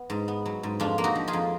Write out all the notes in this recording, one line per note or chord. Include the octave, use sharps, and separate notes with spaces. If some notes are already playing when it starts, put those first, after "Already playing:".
Already playing: B3
G#2
B3
F#3
G#2
F2 D4 F4
A#3
D#4 F#4
F3
F4 G#4
F2